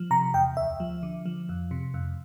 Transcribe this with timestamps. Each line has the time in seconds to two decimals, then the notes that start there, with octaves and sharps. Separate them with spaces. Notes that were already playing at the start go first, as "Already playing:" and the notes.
Already playing: F3
0.11 C3 A#5
0.34 E2 G5
0.57 D2 E5
0.80 F3
1.03 D3
1.26 F3
1.49 F2
1.71 C3
1.94 F2